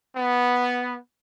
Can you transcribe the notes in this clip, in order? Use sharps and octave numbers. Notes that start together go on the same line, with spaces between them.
B3